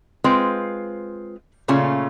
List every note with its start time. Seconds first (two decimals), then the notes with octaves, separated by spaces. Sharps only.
0.24 G#3 C4 F4 B4 C5
1.68 A#2 C#3 A3 C#4 F4